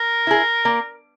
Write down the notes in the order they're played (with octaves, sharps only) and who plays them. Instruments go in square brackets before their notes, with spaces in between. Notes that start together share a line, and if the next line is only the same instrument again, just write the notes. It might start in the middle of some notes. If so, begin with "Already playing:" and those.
Already playing: [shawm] A#4
[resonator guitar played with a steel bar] E4 G#4
A#3